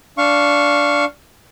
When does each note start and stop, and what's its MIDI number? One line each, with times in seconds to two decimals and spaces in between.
0.18 1.05 62
0.18 1.05 77
0.18 1.05 85